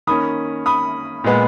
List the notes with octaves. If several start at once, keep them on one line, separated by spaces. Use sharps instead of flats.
D#3 A#3 C#4 B5 D#6
B5 D#6
A#2 G#3 B3